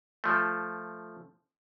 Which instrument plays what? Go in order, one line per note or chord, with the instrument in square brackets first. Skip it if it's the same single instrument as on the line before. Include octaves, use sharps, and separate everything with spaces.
[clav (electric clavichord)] F3 A3